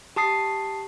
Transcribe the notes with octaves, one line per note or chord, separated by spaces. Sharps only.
G4 A5 D#6 C7